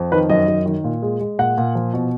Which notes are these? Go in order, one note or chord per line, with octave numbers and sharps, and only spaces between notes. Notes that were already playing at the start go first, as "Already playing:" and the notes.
Already playing: F2
D#3 B4
F#2 D#5
F#2
D#3
A#2
G#3
G#3
A#2 F#5
A#2
F3
B2